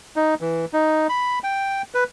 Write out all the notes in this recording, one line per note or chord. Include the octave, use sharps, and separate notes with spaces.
D#4
E3
D#4
B5
G5
B4